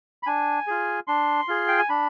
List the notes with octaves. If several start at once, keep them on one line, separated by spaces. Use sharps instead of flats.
B5
D4 G#5
F4 G#4
D4 C6
F4 G#4
G5
G#5
D4 B5